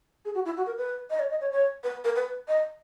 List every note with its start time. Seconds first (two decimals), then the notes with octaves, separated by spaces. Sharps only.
0.25 G#4
0.35 F#4
0.45 E4
0.57 F#4
0.66 A#4
0.77 B4
1.10 D#5
1.19 C#5
1.30 D#5
1.41 C#5
1.52 C#5
1.83 B4
2.04 A#4
2.16 B4
2.48 D#5